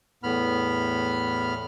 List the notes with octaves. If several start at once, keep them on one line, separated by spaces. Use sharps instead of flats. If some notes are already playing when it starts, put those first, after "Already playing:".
E2 A2 B3 B5 F6